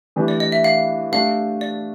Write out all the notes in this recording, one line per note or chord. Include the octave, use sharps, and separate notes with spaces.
E3 A3 D4 G4 B4
D5
D#5
E5
F5
A3 D4 G4 F5
D5